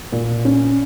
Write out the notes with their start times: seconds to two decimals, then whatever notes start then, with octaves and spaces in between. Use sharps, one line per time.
0.12 A#2
0.45 C#4